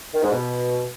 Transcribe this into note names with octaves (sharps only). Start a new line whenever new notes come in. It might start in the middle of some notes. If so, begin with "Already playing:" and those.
D#3
G#2
B2